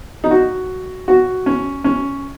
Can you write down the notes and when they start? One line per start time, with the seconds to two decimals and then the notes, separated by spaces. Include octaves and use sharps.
0.24 D#4
0.31 F#4
1.08 F#4
1.46 C#4
1.84 C#4